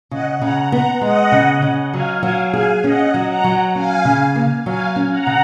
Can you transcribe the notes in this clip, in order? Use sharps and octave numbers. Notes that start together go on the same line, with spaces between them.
C#3 D#5 F#5
C#3 F#5 A#5
B3 F#5 A#5
G#3 D#5 F#5
C#3
C#3
F#3 F5 G#5
F#3 F5 G#5
G#4 F5 G#5
C#4 D#5 F#5
F#3
F#5 A#5
F#3
C#4 F5 G#5
C#3
A#3
F#3 F5 G#5
C#4
F#5 A#5
C#3